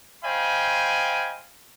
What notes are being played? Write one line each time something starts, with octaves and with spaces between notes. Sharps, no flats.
C5 D#5 F5 G5 G#5 B5